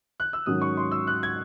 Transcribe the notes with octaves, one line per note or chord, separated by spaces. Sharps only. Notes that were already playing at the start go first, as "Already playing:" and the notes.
F#6
E6
G#2 D#3 F#3 C#4 D#6
C#6
C6
E6
F#6
G#6